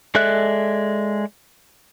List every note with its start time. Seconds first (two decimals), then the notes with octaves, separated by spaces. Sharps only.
0.15 G#3 A4 D5 E5 F#6